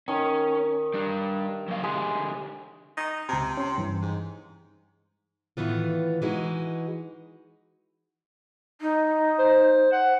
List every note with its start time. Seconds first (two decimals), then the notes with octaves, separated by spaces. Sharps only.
0.08 D#3 C#4
0.94 G3 D4
1.68 F#3 A#3 F5
1.83 D3 G#3 G4 G#4
2.97 D#4
3.29 C#2 C3 A5 A#5
3.57 C#4 C6
3.78 G2 E3
4.02 G#2
5.57 A2 D#3 E3 B3 F4
6.22 E3 G#3 D#4 F#4
8.81 D#4
9.39 C5
9.92 F#5